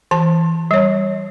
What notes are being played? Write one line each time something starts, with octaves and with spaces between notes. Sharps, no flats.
E3 A5
G3 C#5